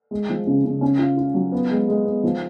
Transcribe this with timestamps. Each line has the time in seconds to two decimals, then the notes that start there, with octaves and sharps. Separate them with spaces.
0.11 G#3
0.29 F3
0.47 C#3
0.64 C#3
0.81 C#4
0.99 F4
1.17 F4
1.34 F#3
1.52 B3
1.71 G#3
1.88 G#3
2.05 B3
2.24 F3